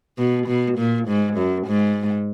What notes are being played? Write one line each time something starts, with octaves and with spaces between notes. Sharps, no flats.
B2
B2
A#2
G#2
F#2
G#2